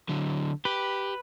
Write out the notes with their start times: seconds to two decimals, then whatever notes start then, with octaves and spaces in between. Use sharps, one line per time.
0.09 D3 F#3
0.65 G4 B4